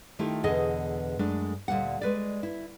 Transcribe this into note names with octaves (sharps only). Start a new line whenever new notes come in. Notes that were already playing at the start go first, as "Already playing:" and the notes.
D#3 A3 E4 F4 G4
E2 B2 D3 G#4 D#5
F#2 G#3 A3 D4
D2 A#2 G3 F#5
G#3 B4 D5
E4